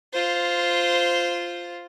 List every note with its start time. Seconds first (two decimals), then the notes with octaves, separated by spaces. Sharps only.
0.13 F4 C5